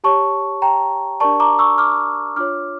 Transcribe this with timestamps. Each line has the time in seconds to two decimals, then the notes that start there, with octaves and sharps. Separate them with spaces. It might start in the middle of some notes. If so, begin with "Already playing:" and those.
0.04 G4 C#5 A5 C#6
0.62 G5 A#5
1.20 D4 G4 A#4 D5 A5 C#6
1.40 A#5 D6
1.59 C#6 E6
1.78 D6 F6
2.36 D4 F4 C#5 D6 F6